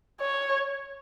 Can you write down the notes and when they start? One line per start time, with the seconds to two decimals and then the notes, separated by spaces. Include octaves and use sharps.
0.22 C#5